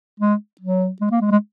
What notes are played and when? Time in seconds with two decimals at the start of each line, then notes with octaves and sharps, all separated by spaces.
0.20 G#3
0.61 F#3
1.01 G#3
1.11 A#3
1.21 G#3
1.31 G#3